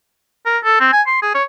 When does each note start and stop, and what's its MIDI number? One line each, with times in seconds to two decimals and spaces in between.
0.46 0.58 70
0.64 0.78 69
0.80 0.88 60
0.92 1.02 80
1.07 1.18 84
1.22 1.33 68
1.34 1.43 73